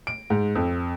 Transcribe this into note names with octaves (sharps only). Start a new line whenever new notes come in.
D7
G#2
F2